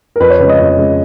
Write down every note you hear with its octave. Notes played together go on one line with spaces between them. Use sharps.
A#4
F2 B4
C#5
C#3 G#3 B4
D#5
F2
C#3 G#3